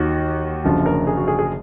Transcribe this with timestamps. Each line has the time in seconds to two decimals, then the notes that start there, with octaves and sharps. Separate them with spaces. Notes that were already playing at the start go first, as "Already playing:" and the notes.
Already playing: D#2 D#3 F#4
0.64 F#1 F#2 D3 F3 F#4
0.86 A#4
1.07 G#4
1.17 F#4
1.28 G#4
1.39 G#4